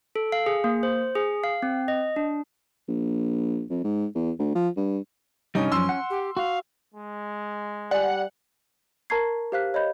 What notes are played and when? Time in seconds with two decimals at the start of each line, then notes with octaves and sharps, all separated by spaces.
0.16 A4
0.32 F5
0.46 G#4
0.64 A#3
0.83 C5
1.15 G#4
1.44 F5
1.62 C4
1.88 D#5
2.16 D4
2.88 A#1
3.70 F2
3.84 G#2
4.15 E2
4.39 D2
4.55 F3
4.77 G2
5.55 C2 G2 G3 C#4 D#4
5.72 F#2 F3 C6 E6
5.89 F#5
6.10 G4
6.37 F#4 F5
6.94 G#3
7.91 G3 D5 F#5 G#5
9.10 A#4 A5 A#5 C#6 G#6 C7
9.52 G4 C5 F5 F6 F#6 B6
9.74 C#5 D#5 B5 G6